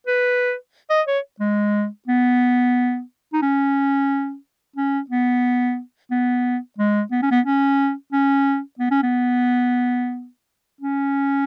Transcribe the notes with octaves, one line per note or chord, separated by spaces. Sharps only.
B4
D#5
C#5
G#3
B3
D#4
C#4
C#4
B3
B3
G#3
B3
C#4
B3
C#4
C#4
B3
C#4
B3
C#4